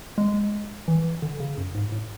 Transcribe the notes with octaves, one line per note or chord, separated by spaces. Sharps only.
G#3
E3
D3
C#3
F#2
G#2
A2